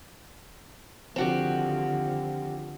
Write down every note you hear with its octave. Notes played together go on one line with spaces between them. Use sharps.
D3 D#3 F3 C4 F#4 G4